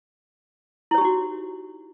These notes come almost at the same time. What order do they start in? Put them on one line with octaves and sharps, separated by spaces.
E4 C#5 G4 D#4 F#4